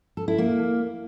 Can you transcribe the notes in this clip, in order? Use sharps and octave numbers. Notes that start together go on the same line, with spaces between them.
A4
E4
A#3